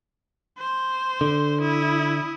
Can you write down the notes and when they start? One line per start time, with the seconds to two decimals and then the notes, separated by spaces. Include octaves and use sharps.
0.58 C5
1.21 D3
1.62 E4 D#6